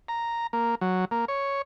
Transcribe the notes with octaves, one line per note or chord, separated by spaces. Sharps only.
A#5
A#3
F#3
A#3
C#5